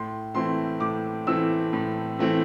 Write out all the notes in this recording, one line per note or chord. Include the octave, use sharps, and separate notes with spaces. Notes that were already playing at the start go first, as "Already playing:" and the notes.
Already playing: A2 C6
E3 A3 C4 E4 C6
A2 D6
E3 A3 C4 E4 E6
A2
E3 A3 C4 E4